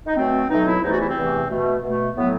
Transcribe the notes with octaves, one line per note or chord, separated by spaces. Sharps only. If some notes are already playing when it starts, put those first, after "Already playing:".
D#4
B2 F#3 A3 C4
B2 F#3 A3 D#4
E4
E2 C3 E3 A3 D#4
F#4
E4
C4
E2 C3 E3 A3
B2 A3
B2 A3
A2 F#3 A3 B3